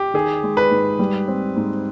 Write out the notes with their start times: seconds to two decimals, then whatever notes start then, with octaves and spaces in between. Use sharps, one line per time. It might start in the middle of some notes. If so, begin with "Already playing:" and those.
Already playing: G4
0.14 D#3 G#4
0.43 G#3
0.57 B4
0.71 G#2
0.99 G3
1.28 C4
1.56 G#2